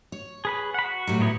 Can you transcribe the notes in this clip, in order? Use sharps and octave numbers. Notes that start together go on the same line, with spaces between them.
C#5
G#4 B4 B5
F#5 B5
F#4
A2 F#3 G3
D#3 B3 E4